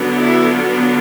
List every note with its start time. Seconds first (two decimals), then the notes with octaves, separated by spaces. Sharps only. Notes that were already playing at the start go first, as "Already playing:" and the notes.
Already playing: D3 F#3 B3 D4
0.20 E4
0.54 F4